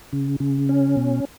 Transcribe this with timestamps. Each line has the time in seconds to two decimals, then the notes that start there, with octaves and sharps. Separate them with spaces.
0.13 C#3
0.40 C#3
0.69 C#4
0.97 B2